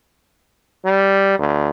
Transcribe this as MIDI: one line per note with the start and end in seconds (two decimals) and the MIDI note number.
0.85 1.39 55
1.39 1.70 38